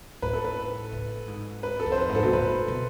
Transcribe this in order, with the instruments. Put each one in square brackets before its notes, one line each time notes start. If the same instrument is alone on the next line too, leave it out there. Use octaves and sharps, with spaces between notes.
[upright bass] A2 [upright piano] B4
[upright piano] A4
B4
[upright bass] A2
G#2
[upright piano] B4
A4
[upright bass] F2
[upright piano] C5
B4
[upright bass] G#2
[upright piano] A4
[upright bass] B2
[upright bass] A2 [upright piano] B4
[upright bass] B2